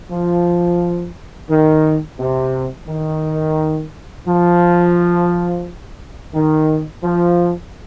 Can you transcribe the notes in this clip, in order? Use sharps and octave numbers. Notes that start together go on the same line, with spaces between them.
F3
D#3
C3
D#3
F3
D#3
F3